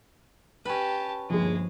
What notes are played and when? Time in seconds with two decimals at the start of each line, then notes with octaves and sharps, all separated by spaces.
0.65 C#4 G4 B4 A5
1.30 G1 D#2 F3 G#3 G#4